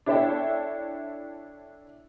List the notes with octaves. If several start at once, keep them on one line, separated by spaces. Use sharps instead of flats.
D4 E4 A4 C#5 E5 G5